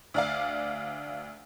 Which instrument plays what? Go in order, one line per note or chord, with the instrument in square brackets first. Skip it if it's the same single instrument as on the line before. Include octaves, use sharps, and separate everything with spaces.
[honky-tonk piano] D2 D5 F5